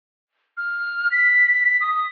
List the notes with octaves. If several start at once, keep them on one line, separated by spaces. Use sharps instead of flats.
F6
B6
D#6